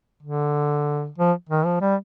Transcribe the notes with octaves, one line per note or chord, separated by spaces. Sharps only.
D3
F3
D#3
F3
G3